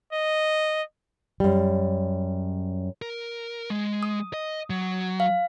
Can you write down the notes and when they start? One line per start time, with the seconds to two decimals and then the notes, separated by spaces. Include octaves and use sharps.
0.13 D#5
1.40 F#2 G3
3.02 A#4
3.70 G#3
4.03 D#6
4.34 D#5
4.70 F#3
5.20 F5